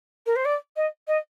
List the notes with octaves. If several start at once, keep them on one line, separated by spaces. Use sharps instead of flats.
A#4
C5
D5
D#5
D#5